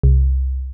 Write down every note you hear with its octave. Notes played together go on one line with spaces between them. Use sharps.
C2